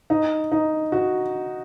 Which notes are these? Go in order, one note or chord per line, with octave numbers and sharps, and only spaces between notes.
D#4
D#4
F#4